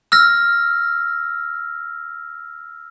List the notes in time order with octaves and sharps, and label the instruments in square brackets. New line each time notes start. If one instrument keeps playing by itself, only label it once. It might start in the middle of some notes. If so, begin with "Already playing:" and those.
[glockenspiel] E6 F6 A#6